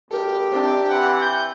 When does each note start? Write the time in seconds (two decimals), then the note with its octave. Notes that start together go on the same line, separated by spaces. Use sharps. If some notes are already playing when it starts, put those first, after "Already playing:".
0.11 G#1 G4 A4 A#4
0.52 C#2 G#2 C3 C4 D4 A5
0.90 C3 E3 F#5
1.21 G6